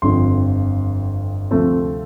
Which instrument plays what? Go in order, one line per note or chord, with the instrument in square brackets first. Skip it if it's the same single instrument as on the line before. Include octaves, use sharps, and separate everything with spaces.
[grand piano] G1 F2 D3 F3 C6
D2 C3 F3 A3 C4